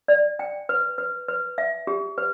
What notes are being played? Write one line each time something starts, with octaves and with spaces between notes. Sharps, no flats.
D5
G5
B4
B4
B4
E5
G4
B4